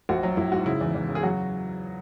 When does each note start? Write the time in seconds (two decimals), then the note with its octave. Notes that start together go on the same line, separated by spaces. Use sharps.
0.09 A#1 F#4
0.23 F#3
0.37 A#1 E4
0.52 G#2 F#4
0.66 C#3 E4
0.81 E2
0.95 E2
1.09 C#3
1.15 G#4
1.23 F#3 F#4